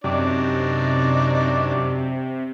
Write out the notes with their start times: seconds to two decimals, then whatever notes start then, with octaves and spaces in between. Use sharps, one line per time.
0.04 F#2 C3 D4 D#4 D5